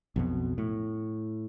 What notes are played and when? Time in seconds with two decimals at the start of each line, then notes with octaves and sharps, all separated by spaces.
0.16 B1 F2 B2
0.58 A2